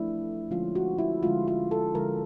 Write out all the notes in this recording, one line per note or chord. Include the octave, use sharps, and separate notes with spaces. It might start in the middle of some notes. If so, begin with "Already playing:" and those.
Already playing: F3 A3 D4 E4
D3 F3 G#3 C#4 F4
F#4
E4
D3 F3 G#3 C#4 F4
F4
A4
D3 F3 G#3 A#4